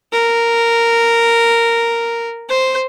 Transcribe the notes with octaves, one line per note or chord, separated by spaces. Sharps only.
A#4
C5